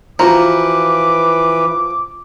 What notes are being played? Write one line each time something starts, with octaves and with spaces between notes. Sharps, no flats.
E3 F3 F#4 B4 A#5 D6